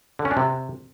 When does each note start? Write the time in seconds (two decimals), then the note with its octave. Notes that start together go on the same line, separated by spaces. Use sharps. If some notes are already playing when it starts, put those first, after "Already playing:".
0.19 D3
0.25 C#4
0.31 D4
0.37 C3